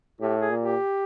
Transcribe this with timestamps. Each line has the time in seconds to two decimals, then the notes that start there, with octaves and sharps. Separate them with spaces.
0.20 A2 G4
0.40 G#4
0.50 A#2
0.59 G4